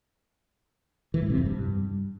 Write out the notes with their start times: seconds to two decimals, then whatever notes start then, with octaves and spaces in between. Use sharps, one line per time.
1.14 E3
1.22 G#2
1.30 C3
1.38 F2
1.46 G2